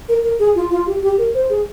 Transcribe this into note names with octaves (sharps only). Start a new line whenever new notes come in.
A#4
A#4
G#4
F4
F4
G4
G4
A#4
C5
G#4